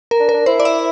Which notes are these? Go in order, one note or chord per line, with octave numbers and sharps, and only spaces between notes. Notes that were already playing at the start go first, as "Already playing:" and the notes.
A#4
D4
A#4
D4
E4 C5
D5
E5